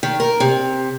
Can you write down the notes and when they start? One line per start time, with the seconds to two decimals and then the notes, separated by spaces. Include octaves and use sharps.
0.03 D#3
0.20 A#4
0.40 C3